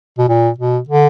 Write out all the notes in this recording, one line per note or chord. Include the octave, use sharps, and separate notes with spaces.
B2
A#2
B2
D3